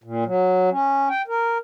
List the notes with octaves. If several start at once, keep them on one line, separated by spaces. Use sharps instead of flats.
A#2
F#3
C#4
G5
A#4